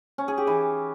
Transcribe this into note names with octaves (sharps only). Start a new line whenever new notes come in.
C#4
G#4
G4
E3